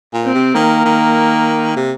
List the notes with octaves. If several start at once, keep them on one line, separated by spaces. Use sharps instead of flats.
A#2
C4
C3
D#3 A#3
D#3
C3